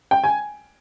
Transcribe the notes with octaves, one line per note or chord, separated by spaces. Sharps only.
G5
G#5